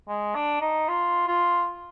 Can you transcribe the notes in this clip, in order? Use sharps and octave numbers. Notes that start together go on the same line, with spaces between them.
G#3
D4
D#4
F4
F4